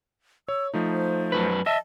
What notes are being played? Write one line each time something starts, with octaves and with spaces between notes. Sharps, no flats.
C#5 E6
F3 A3 D#4 C5
F#2 C3 B4
D#5 E5 A5